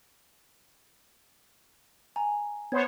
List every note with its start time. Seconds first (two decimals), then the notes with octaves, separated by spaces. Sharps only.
2.16 G#5 A#5
2.72 B3 C5 C#5 G#6